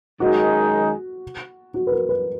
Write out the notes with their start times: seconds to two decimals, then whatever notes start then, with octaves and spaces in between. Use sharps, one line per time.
0.20 F#2 D#3 G#3 D#4 F#4 G#4
1.74 F#4
1.87 B4
1.92 A#4
2.09 B4